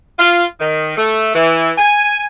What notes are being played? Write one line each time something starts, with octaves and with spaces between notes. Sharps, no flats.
F4
D#3
A3
E3
G#5